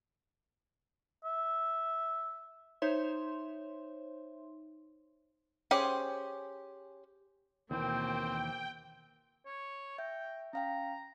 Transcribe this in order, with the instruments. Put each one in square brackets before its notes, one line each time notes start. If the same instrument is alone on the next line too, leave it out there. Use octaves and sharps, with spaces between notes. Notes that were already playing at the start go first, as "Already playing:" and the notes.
[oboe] E5
[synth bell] D#4 C5 C#5 E5 C6
[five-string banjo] C#4 G4 G#4 C5
[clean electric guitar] D#2 E3 [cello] B2 A#3 [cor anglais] C4 [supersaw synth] G5
[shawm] C#5
[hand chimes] E5 [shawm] G5
[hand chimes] C#4 F5 G5 [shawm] A#5